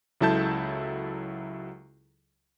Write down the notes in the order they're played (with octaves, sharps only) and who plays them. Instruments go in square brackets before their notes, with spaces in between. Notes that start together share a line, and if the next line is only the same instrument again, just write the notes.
[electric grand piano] C#2 F#3 E4 A4 A5 G6